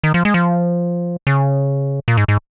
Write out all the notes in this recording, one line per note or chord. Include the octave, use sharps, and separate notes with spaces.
D#3
F3
G#3
F3
C#3
A#2
G#2
G#2